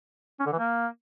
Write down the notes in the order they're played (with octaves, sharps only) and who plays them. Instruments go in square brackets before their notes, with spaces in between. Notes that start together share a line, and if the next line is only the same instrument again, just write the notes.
[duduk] C#4
D3
E3
A#3